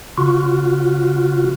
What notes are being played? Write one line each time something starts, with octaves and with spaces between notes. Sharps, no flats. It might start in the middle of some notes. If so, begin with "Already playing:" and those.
C#3 F4 F#4